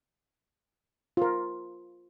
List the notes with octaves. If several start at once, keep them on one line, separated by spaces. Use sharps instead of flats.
F4 A#4